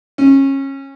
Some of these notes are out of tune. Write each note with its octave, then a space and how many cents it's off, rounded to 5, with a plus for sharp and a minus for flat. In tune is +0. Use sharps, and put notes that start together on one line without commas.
C#4 -25